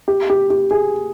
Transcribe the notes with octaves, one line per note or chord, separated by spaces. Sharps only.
G4
G4
G4
G#4